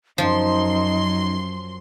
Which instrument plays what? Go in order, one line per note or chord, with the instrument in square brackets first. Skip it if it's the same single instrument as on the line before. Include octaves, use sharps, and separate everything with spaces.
[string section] F#2 C6 [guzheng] F3 [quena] D#4